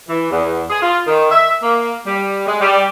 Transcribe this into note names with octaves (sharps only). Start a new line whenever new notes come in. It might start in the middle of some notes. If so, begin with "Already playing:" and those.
E3
E2
G#4
F4
D#3
E5
A#3
G3
G#3
G3